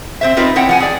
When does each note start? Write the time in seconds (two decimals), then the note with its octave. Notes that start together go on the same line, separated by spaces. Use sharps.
0.21 C4 C5 E5
0.37 C4 D#4 F4 A#4 B4
0.56 C4 E4 C#5 F#5 G5
0.69 F3 F#5 G#5
0.80 G#4 D5